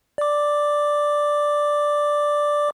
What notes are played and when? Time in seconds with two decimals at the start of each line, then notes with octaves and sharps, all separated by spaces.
0.18 D5 D6